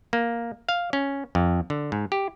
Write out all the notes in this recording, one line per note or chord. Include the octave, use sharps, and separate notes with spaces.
A#3
F5
C#4
F2
D3
G#2
G4